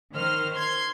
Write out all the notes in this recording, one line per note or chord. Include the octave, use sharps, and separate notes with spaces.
D#3 C5 F6
C6 G#6